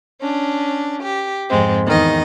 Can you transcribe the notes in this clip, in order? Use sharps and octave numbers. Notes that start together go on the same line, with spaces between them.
C#4 D4
G4
F2 G#2 G#3 C4
E2 D#3 D#5